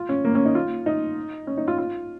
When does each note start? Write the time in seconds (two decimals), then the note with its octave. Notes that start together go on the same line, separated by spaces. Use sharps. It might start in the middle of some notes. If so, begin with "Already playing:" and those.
Already playing: F4
0.09 C#4
0.24 A#3
0.35 C#4
0.45 D#4
0.55 F4
0.86 D#4
1.47 C#4
1.57 D#4
1.68 F4
1.78 F4